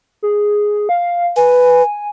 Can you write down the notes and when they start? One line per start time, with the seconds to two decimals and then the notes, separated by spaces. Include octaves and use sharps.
0.23 G#4
0.89 F5
1.36 B4 G#5